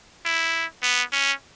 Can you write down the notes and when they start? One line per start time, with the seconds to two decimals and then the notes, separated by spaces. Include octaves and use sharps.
0.25 E4
0.83 B3
1.12 C#4